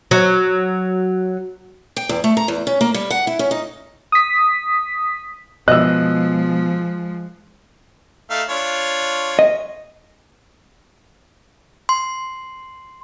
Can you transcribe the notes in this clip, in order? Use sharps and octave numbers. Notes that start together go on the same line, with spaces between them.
F#3
G5
E2
A3
A#5
E2
C#4
A#3
G3
F#5
E4
C#4
D#4
D#6 B6
B2 F3 G#3 D#5 E6 F#6
A3 D#4 F5
D4 F4 C#5
D#5
C6